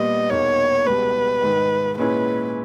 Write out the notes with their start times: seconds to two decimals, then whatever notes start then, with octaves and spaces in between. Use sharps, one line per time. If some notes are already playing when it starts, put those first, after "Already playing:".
Already playing: A#2 G3 B3 D#5
0.29 E2 B2 A#3 D#4 C#5
0.86 C#2 B2 G3 B4
1.42 G#2 D#3 G#3
1.98 A#2 G#3 C#4 E4 B4